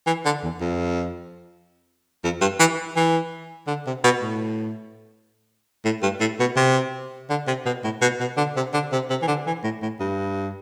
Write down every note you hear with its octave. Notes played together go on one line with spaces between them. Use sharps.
E3
D3
E2
F2
F2
G2
E3
E3
D3
C3
B2
A2
A2
G2
A2
B2
C3
D3
C3
B2
A2
B2
B2
D3
C3
D3
C3
C3
E3
D3
E3
A2
A2
G2